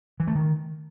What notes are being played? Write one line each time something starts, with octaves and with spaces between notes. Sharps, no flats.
E3
A3
D#3